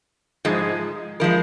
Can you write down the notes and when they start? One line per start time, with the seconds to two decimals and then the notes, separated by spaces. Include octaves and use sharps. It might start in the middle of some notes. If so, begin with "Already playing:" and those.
0.45 G#2 F3 G#3
1.20 F3 G#3 A#4